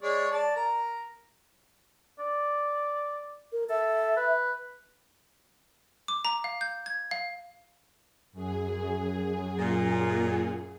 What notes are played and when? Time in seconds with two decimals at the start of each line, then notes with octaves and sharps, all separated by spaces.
0.02 G#3 C#5 D5
0.31 D5 A5
0.56 A#4 A#5
2.19 D5
3.52 A#4
3.69 A4 E5
4.16 B4
6.08 D6
6.25 A#5
6.44 F5
6.61 G6
6.86 G#6
7.11 F5
8.32 F#2 G#4
9.57 A#2